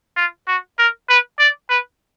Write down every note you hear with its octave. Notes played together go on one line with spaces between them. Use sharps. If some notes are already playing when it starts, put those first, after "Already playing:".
F4
F#4
A#4
B4
D5
B4